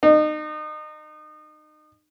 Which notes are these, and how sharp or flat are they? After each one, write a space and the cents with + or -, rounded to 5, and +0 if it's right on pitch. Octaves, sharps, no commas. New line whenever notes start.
D#4 -30